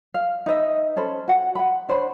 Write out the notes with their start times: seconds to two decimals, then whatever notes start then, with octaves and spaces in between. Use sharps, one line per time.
0.14 F5
0.46 D#4 B4 D#5 E5
0.96 C#4 A4 C5 B5
1.28 F#4 F#5
1.55 F#5 B5
1.89 D4 C5 C#5 B5